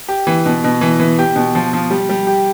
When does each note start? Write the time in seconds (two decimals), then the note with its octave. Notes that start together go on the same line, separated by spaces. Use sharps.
0.09 G4
0.27 E3
0.46 B2
0.64 B2
0.81 E3
0.99 E3
1.19 G4
1.36 B2
1.55 F3
1.73 F3
1.90 G3
2.09 G3
2.27 G4